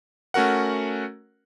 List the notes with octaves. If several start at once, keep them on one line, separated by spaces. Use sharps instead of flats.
A3 C#4 F#4 A#4 F#5